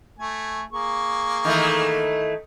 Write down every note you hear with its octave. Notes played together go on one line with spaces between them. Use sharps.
A3 G#5
A#3 G#4 C#6
D#3 E3 A3